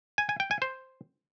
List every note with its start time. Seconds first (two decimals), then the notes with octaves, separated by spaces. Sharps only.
0.18 G#5
0.29 G#5
0.40 G5
0.51 G#5
0.62 C5